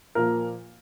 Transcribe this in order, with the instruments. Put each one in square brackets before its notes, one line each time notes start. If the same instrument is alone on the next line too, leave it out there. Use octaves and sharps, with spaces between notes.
[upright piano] A#2 F3 A#4